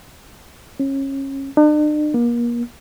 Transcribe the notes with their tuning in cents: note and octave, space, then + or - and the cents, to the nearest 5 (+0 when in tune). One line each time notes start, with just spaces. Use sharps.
C#4 -25
D4 +45
A#3 +35